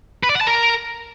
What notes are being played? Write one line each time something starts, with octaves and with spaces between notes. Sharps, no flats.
B4
D5
F#5
A5
A#4